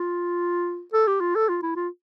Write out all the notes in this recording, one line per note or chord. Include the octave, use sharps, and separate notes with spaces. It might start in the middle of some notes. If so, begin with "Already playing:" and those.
Already playing: F4
A4
G4
F4
A4
F4
E4
F4